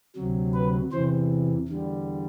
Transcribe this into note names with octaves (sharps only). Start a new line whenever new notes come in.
D2 C3 F#3
B4
E2 C3 E3 C5
E2 D3 G3